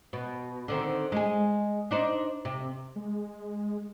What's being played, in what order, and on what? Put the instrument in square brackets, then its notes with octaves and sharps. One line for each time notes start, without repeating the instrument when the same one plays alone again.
[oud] B2
D3 D#3 C4
G#3 G#4
D4 D#4 C5
C3
[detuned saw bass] G#3